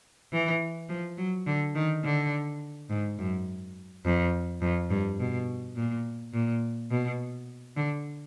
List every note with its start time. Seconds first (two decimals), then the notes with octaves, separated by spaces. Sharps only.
0.33 E3
0.89 F3
1.18 F#3
1.47 D3
1.75 D#3
2.04 D3
2.90 G#2
3.19 F#2
4.05 F2
4.62 F2
4.90 G2
5.19 B2
5.76 A#2
6.33 A#2
6.91 B2
7.77 D3